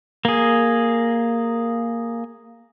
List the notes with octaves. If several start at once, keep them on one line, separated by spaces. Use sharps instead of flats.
A#3 G#4